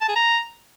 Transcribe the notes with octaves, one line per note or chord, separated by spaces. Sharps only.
A5
G#4
A#5